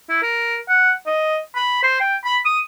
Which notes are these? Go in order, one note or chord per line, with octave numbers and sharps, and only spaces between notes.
E4
A#4
F#5
D#5
B5
C5
G5
B5
D#6